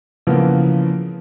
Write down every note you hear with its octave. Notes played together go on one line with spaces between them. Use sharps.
C#3 E3 F3 A#3 B3